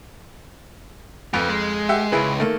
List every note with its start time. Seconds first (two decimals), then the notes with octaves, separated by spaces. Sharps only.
1.34 F2 F4 B4
1.49 G#3
1.89 G4 E5 F#5
2.12 C#2 E4 G#4 B4
2.39 D#3 A3 A#3